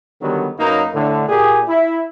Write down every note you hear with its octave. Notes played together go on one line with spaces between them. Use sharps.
D3 D#3 F#3 G3 B3
F#2 F#3 A#3 D#4 B4
A2 D3
A#2 G4 G#4
E4